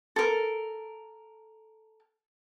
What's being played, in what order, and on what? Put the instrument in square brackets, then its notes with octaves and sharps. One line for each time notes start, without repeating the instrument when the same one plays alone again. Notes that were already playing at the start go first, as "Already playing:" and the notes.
[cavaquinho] A4 A#4